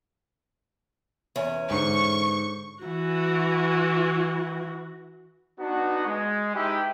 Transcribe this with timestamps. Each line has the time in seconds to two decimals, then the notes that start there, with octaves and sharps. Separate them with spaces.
1.36 E2 C#4
1.71 G#2 D3 C#6
2.84 E3 F#4
5.60 B3 D4 D#4 F#4
6.07 G#3
6.55 G#3 D#4 E4 G4 B4 G5